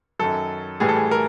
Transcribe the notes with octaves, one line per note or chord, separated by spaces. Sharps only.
F#2 D#3 F#3 A4
A2 E3 G3 G#4
A4
G#4
A#4